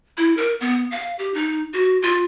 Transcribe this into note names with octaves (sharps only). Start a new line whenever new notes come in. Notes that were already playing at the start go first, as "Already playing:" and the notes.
E4
A#4
B3
F5
G4
D#4
F#4
F4